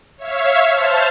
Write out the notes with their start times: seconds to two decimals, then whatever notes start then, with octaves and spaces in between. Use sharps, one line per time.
0.18 C#5 E5 F5
0.71 C5 A5 F6